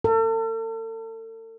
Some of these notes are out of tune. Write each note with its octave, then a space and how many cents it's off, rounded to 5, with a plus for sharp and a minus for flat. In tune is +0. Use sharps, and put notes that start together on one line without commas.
A4 +40